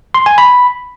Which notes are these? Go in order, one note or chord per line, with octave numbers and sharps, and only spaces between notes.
C6
G#5
B5